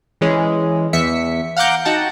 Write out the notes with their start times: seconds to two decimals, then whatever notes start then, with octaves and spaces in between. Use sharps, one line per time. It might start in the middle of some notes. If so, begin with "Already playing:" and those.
0.21 E3 G#3 C#4
0.93 E2 E5 B6 C#7
1.57 F5 F#5 A#5 D6 G6
1.85 D#4 F#4 F#5 G5 A5